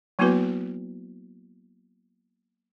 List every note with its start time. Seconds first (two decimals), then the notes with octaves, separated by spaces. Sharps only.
0.19 F#3 A#3 B3 E4 F#4 B4